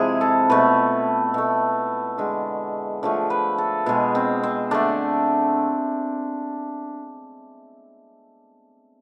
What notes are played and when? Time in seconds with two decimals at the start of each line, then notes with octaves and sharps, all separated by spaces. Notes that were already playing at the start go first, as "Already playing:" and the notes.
Already playing: C3 F3 G#3 E4 G#4
0.21 A4
0.50 B2 A3 B4
1.34 B2 A3
2.18 D3 G#3
3.03 D3 F3 A3
3.30 B4
3.58 A4
3.86 B2 G#3 G#4
4.15 C4
4.43 C4
4.71 D3 A3 D4